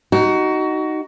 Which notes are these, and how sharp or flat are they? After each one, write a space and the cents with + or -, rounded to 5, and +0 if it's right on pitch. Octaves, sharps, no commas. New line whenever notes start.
D#4 +0 F#4 +20